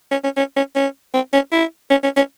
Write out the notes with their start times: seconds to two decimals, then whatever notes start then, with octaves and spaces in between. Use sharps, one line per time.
0.11 C#4
0.24 C#4
0.37 C#4
0.56 C#4
0.75 C#4
1.14 C4
1.33 C#4
1.52 E4
1.90 C#4
2.03 C#4
2.16 C#4